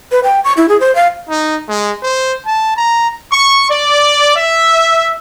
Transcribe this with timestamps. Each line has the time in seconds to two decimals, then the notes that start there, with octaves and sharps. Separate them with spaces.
0.12 B4
0.24 G5
0.44 C#6
0.57 E4
0.69 G#4
0.80 C5
0.95 F5
1.29 D#4
1.68 G#3
2.02 C5
2.46 A5
2.77 A#5
3.31 C#6
3.70 D5
4.36 E5